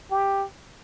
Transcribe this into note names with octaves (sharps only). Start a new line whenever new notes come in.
G4